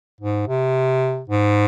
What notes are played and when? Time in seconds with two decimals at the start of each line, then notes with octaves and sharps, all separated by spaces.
0.21 G#2
0.48 C3
1.29 G#2